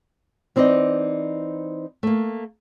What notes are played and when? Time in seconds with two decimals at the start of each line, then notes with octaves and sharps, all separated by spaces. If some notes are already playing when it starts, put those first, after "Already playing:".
0.56 E3 C4 D#4 D5 D#5
2.03 A3 A#3